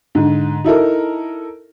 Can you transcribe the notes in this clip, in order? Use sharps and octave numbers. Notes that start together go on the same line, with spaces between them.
G#2 D3
D#4 E4 A4 A#4